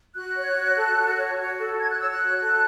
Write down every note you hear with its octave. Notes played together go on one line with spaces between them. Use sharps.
F#4 F#6
C#5
F#4
A4
F#4
C#5
F#4
A4
F#4 G#6
F#6
C#5 E6
F#6
F#4
A4